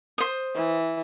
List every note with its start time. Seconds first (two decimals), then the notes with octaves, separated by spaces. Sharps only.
0.18 C5 D#6
0.55 E3